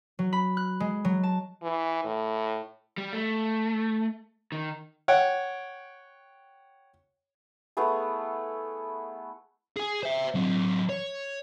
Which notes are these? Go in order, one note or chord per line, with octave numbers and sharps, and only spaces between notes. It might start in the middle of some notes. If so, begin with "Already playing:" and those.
F#3
B5
F#6
G#3
F#3
A5
E3
A2
G3
A3
D#3
C#5 F#5 G5
A3 B3 E4 G#4
G#4 G#5
C5 E5
F#3 C4
C#5